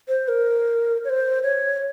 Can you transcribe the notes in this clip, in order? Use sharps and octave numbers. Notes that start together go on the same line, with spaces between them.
C5
A#4
C#5
C5
C#5